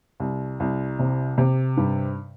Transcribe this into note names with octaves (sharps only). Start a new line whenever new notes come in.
C2
C2
C3
C3
G2